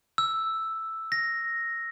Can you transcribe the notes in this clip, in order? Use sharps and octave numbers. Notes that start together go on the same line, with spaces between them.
E6
A#6